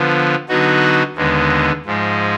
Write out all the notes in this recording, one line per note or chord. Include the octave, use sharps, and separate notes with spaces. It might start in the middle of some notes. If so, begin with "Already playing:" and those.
Already playing: D3 F3 B3
D3 F#3 B3 D#4 F#4
D#2 D3 G#3 B3
G#2 F3 G#3